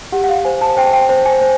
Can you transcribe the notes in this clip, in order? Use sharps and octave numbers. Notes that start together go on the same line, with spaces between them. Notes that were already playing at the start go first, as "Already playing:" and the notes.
G4 F#5
F#5
F5
C5 G#5
A5
C5 G5
G5
C5
G#5
C5